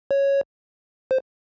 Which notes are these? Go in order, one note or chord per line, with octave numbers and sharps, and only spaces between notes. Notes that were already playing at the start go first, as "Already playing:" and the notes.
C#5
C5